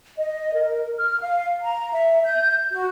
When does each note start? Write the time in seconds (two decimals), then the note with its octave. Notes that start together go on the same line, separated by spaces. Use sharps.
0.17 D#5
0.55 A#4
0.97 F6
1.21 F5
1.62 A#5
1.93 E5
2.25 G6
2.73 F#4